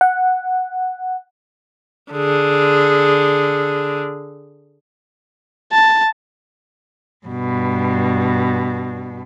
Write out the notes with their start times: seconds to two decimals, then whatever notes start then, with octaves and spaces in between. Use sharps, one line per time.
0.01 F#5
2.13 D3 G#4
5.73 A5
7.27 G2 B2